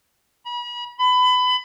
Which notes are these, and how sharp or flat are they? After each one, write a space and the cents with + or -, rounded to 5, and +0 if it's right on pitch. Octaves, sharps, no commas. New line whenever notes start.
B5 -40
B5 +25